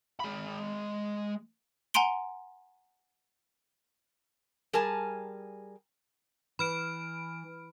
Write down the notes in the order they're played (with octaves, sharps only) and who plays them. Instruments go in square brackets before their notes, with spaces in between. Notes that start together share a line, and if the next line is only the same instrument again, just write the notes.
[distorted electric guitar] G#3 B5
[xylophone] F#5 G#5 A#5 C6 D7 G7
[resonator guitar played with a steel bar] G3 G#4 A#4 G#5 A5
[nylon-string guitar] E3 [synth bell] B5 F6 D7